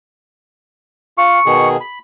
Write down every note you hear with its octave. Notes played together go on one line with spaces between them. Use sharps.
F4 F5 C#6
B2 D#3 G#4
B5